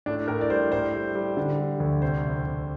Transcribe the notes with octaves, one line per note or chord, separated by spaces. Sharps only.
A2 D4
A2 A#4
D5
G3 C5
A2 C5
G3
G3
D3
G3
D2
C2 C5
C2
C2